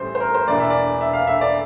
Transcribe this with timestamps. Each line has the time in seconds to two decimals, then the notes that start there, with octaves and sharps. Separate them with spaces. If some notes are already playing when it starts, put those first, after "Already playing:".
Already playing: A1 A2 E3 G3 C5
0.15 C5
0.20 A#4
0.35 C5
0.47 E1 E2 E3 A#3 D5
0.60 E5
0.70 D5
1.01 E5
1.13 F5
1.27 E5
1.41 D5